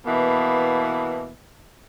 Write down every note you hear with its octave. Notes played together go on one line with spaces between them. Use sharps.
B2 E3 A#3 B3